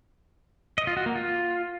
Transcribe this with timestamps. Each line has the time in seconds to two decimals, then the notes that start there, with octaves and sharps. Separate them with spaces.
0.78 D#5
0.87 F4
0.97 F#4
1.06 A#3
1.15 F4